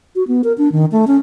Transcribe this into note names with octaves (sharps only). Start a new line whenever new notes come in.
F#4
B3
A#4
D4
D#3
A3
C#4